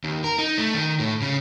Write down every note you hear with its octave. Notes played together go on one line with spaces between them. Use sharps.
D#2
A#4
D#4
A3
D#3
A2
C#3